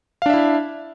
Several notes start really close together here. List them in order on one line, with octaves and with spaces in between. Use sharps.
F5 D4 E5 E4